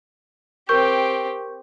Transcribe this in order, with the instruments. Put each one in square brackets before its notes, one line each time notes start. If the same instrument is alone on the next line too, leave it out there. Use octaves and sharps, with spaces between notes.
[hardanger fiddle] C4 G4 [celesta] A#4 C#6 G6